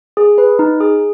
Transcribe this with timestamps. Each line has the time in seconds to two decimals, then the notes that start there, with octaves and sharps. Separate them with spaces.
0.17 G#4
0.38 B4
0.59 D#4
0.80 G#4